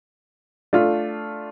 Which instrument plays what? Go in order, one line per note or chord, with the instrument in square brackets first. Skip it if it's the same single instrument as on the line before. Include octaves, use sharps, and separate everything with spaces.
[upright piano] A3 D4 F4